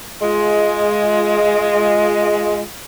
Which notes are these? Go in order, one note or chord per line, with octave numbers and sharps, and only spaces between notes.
G#3 F4